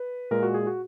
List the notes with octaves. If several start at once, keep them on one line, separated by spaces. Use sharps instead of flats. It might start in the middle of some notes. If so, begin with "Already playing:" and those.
Already playing: B4
A#2 G#3 A#4
F#4
G#4
F#4